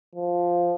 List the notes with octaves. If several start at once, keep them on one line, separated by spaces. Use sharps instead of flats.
F3